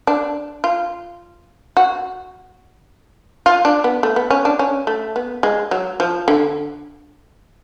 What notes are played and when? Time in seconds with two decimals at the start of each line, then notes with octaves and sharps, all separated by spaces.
0.07 D4
0.64 F4
1.77 F#4
3.46 F4
3.65 D4
3.84 B3
4.03 A3
4.16 B3
4.30 C#4
4.45 D4
4.59 C#4
4.87 A3
5.16 B3
5.43 G#3
5.71 F#3
6.00 F3
6.28 D3